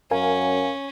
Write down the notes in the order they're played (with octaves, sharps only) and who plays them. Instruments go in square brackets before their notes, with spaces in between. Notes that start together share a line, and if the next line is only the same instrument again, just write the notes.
[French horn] F#2 [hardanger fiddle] C#4 [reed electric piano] A#4 F5 G#5